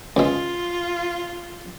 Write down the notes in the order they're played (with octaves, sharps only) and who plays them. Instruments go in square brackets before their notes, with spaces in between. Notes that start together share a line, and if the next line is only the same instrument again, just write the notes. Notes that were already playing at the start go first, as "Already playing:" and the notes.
[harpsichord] C#2 G#3 [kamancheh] F4